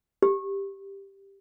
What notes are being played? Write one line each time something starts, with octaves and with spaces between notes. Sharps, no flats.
G4